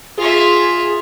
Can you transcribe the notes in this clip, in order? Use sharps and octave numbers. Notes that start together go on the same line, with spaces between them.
F4 G#4 E5